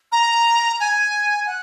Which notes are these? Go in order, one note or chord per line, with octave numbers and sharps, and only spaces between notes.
A#5
G#5
F#5